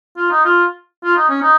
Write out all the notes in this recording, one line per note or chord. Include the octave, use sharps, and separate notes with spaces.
F4
D#4
F4
F4
D#4
C#4
D#4